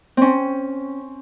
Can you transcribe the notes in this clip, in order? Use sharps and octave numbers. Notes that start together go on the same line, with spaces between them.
C4 C#4